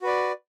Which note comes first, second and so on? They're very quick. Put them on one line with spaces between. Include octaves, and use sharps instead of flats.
F#4 B4 D5